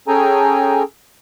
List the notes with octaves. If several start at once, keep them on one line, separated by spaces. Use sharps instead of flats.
C#4 G#4 A4 G5 G#5 A#5